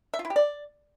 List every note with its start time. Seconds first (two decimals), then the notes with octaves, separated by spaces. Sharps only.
0.14 E5
0.19 F4
0.25 E4
0.30 G4
0.36 D5